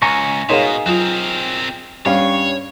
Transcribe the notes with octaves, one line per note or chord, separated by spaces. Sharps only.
C#2 G#5 A#5 C#6
B2 D#4 G#4 A#4 C#5 F5 C6
F#3 C4 F4 A#4
G2 C#4 C#5 F5